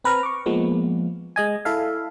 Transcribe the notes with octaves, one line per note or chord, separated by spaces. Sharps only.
C4 B4 A#5 F6
C#6 D6
F3 G#3 A#3 B3
G#3 D#5 G#5
E4 A4 E5 F5